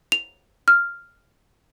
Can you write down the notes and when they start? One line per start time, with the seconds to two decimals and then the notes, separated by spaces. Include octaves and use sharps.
0.12 F7
0.68 F6